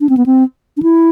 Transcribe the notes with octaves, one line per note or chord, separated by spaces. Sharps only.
D4
C4
B3
C4
D4
E4